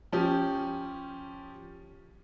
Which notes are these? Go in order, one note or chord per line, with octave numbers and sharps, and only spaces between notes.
F3 C#4 G4